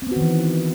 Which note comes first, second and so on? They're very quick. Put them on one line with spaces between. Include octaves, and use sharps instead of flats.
C4 B3 F#4 D#3 E3